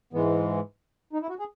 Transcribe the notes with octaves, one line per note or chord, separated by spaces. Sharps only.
G#2 E3 G#3 B3
D#4
E4
F#4
G#4